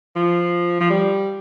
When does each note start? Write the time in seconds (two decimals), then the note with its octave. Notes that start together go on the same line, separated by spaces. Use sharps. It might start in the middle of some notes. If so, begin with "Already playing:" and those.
0.16 F3
0.80 F3
0.90 G3